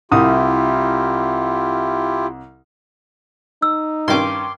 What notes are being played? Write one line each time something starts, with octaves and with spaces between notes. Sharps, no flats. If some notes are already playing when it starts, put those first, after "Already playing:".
C2 E4 F4 G4 D#6
D#4 E6
G2 D#3 C#4 C6 D6